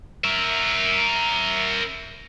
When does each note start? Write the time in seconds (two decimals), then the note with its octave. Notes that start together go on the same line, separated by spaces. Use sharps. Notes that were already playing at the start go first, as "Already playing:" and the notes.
0.24 A#4 E5